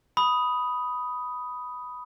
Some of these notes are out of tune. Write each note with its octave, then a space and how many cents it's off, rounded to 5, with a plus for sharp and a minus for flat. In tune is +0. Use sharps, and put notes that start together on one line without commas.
B5 +0 D#6 +5